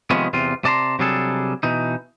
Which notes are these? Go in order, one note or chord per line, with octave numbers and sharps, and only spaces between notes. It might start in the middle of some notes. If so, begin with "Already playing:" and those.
C3 D#3 F3 G#3 B3 C#4
E2 C3 F4
C3 D5 A5 A#5 C6
C3 F#3 G3 D4 G#4 A4
B2 E3 D#4